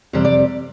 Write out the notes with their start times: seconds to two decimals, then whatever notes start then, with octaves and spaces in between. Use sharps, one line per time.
0.13 F2 C3 G3 C5
0.25 D5